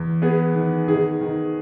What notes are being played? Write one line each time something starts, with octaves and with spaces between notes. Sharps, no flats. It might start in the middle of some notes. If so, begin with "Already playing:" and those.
Already playing: E2
B3 G#4
D#3
D#3 G#4
D#3